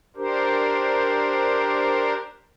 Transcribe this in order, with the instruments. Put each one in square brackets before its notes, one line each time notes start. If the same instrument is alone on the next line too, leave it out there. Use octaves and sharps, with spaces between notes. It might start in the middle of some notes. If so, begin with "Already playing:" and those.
[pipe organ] D4 G4 A#4 C5